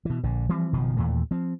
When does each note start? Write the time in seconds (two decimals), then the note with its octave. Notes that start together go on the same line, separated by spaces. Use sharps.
0.05 B2 E3
0.24 A#1 D3
0.49 E3 F3 G3 C4
0.73 F#1 B2 D#3 F3
0.97 D#2 A#2 E3 A3
1.31 F3 C4